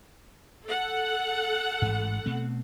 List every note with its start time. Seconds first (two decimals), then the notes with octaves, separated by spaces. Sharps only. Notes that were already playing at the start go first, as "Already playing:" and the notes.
0.65 A4 F#5
1.82 A1 G#2
2.26 B2 A3 C4